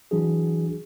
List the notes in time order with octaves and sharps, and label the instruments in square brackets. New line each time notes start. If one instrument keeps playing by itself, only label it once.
[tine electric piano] E3 F#3 D4 F#4 G#4